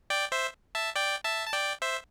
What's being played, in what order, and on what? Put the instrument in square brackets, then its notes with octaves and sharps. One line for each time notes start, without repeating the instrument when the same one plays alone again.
[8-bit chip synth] D5 G5
C5 E5
E5 A5
D5 G5
E5 A5
A5
D5 G5
C5 E5